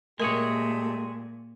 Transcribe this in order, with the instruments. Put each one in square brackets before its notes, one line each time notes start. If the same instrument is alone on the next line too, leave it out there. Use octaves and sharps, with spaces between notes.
[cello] A#2 [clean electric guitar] G#3 G#4 C#5 [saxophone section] A3 G4 [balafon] A#4